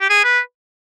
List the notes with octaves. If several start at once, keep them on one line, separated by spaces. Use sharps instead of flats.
G4
G#4
B4